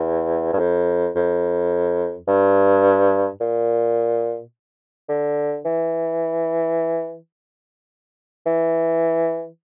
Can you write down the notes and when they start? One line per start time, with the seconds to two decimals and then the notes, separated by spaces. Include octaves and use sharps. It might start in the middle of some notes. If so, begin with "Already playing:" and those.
Already playing: E2
0.53 G2
0.59 F2
1.15 F2
2.28 G2
3.40 A#2
5.09 D3
5.65 E3
8.46 E3